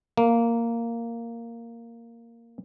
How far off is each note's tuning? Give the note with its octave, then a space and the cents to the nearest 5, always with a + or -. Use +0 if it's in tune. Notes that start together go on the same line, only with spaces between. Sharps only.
A#3 -5